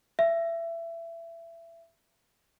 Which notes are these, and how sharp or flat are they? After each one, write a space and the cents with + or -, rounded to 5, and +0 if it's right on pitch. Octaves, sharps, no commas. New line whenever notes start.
E5 +25